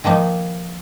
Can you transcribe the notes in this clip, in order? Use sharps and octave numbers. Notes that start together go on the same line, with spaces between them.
D#3 F3 A#3 D#4